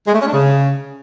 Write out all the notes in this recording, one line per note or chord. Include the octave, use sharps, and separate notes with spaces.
G#3
A3
C#4
D4
C#3